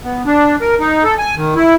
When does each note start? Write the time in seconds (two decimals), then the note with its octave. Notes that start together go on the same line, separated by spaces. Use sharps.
0.04 B3
0.26 D4
0.61 A#4
0.79 D#4
1.04 A4
1.19 G#5
1.36 D#3
1.56 E4